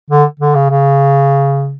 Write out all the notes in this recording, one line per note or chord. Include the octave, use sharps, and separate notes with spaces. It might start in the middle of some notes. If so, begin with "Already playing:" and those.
D3
D3
C#3
C#3